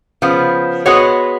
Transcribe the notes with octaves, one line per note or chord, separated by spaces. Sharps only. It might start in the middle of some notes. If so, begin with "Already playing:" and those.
C#3 F3 B3
G#3 B3 F#4 C#5